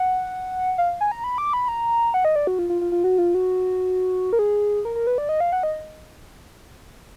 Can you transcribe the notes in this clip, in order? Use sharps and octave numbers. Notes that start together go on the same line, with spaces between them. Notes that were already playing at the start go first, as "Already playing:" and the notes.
Already playing: F#5
F5
G#5
A#5
B5
D6
B5
A#5
F#5
D#5
D5
F#4
F4
F4
F4
F4
F#4
F4
F#4
A#4
G#4
A#4
A#4
B4
D5
D#5
F5
F#5
D#5